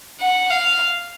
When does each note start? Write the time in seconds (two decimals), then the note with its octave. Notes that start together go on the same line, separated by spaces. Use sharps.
0.21 F#5
0.50 F5